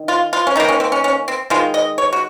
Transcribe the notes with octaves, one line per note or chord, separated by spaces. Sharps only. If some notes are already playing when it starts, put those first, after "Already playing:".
Already playing: D#3
F4
F4
C#4
D#3 A#3 D#4
C#4
C4
C#4
C#4
C4
D#3 G#3 F4
D#5
C#5
F#4